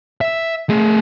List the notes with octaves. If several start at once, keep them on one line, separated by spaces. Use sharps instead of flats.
E5
A3 G#4